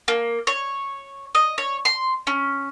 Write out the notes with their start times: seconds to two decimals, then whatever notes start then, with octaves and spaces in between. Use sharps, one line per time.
0.08 A#3
0.47 C#5
1.35 D#5
1.58 C#5
1.85 C6
2.27 C#4